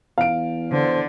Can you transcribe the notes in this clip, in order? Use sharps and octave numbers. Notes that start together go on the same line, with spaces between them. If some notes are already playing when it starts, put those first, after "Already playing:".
E2 F5 D7
D3 C5